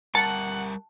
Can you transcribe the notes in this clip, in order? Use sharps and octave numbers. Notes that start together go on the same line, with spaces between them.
G3 A#4 F#5 A5 A6 C#7